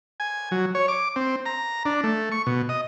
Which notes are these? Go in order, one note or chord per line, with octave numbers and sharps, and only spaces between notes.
G#5
F#3
C#5
D6
C4
A#5
D4
A3
C#6
B2
D#5